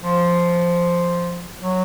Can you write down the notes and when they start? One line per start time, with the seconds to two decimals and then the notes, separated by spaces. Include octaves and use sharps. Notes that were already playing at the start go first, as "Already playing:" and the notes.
0.02 F3
1.60 F#3